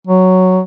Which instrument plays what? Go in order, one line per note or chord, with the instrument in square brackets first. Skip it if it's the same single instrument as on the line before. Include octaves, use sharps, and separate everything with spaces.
[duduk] F#3